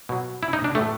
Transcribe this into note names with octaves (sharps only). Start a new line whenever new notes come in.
B2 F#3
E4
D#4
D4
A2 E3 A3